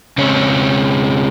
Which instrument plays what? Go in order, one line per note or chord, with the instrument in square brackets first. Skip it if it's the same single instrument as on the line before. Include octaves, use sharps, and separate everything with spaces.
[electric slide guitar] C#3 G#3 C4 C#4 C#5